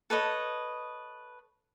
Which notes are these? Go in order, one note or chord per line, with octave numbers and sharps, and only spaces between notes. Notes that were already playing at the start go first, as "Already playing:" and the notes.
A4 B4 C#5 D#5